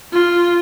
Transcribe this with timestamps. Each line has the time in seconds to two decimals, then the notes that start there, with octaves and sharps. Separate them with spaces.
0.13 F4